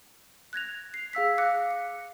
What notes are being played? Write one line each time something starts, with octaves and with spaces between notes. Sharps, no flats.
F#6 G#6 A#6 F7
C7
G#4 F5 E6 B6
F5 D6 F#6 A#6 C#7
C#7